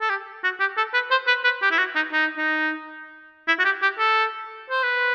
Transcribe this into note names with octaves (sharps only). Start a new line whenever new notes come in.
A4
G4
F#4
G4
A4
B4
C5
B4
B4
G4
E4
F#4
D#4
D#4
D#4
E4
F#4
G4
G4
A4
C5
B4